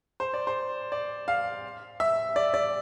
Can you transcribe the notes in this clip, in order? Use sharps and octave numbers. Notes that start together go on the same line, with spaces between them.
C5
D5
C5
D5
F5
E5
D5
D5